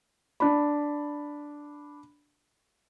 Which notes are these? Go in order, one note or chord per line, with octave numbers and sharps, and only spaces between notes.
D4 B5